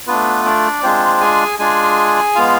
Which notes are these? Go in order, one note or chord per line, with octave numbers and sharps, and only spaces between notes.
A3 B3 D4 F4 B4
D4 D5
G#3 C4 D4 F4 C5
G#4 G#5
G#3 D4 F4 G#4 G#5
G#3 B3 F4 F5